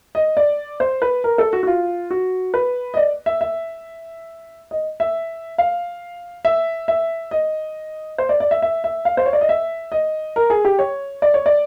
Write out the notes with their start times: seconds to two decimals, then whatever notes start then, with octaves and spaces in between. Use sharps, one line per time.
0.15 D#5
0.37 D5
0.80 C5
1.02 B4
1.24 A#4
1.38 A4
1.53 F#4
1.63 F#4
1.67 F4
2.11 F#4
2.54 B4
2.94 D#5
2.97 D5
3.26 E5
3.41 E5
4.71 D#5
5.00 E5
5.58 F5
6.45 E5
6.88 E5
7.31 D#5
8.18 C5
8.29 D5
8.40 D5
8.51 E5
8.62 E5
8.84 E5
9.05 F5
9.17 C5
9.26 C#5
9.33 D5
9.41 D#5
9.49 E5
9.92 D#5
10.36 A#4
10.50 G#4
10.65 G4
10.79 C#5
11.22 D5
11.34 C#5
11.46 D5